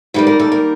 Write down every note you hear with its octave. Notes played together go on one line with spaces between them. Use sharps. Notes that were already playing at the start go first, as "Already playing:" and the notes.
D#3 G3 A#3 B4
A#4
A4
A#4